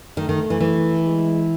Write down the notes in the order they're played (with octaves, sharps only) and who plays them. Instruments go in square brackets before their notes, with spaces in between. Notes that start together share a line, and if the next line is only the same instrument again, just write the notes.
[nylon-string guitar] D#3 [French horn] A3
[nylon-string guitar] D#3
E3
E3
[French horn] G#3